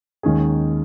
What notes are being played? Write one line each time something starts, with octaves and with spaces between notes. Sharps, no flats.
D#2 D#3 G#3 C#4 G#4